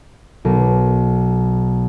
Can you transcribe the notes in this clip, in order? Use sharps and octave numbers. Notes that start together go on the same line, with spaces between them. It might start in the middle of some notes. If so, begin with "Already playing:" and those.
B1